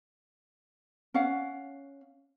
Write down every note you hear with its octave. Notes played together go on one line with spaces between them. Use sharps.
C#4 F5 F#5